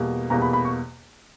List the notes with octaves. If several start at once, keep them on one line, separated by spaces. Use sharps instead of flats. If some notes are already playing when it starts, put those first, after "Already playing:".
Already playing: E2 B2 G3 A#3
E2 B2 G3 A#3 A#5
B5
B5
C#6